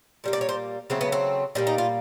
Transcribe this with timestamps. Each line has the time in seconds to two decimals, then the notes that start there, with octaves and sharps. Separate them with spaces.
0.24 A#2 G3 A#3
0.33 D5
0.41 C#5
0.49 C5
0.90 C#3 F#3 A3 C4
1.01 B3
1.12 C4
1.55 A#2 G3 A#3 D4
1.67 D#4
1.78 F4